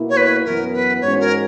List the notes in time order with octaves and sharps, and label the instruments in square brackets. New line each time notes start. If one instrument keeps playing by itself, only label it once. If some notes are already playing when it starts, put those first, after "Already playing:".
Already playing: [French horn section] B2 A#3 E4
[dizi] C#5
B4
[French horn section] F#2 E3 B3 [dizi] A#4
[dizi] B4
[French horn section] G#2 E3 G#3 C#4 F#4 [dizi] C#5
[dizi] A#4